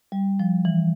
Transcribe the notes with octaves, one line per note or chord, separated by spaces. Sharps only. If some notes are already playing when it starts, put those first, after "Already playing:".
G3
F3
E3